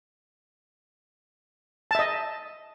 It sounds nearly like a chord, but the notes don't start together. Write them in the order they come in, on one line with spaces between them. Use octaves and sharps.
A5 E5 D#5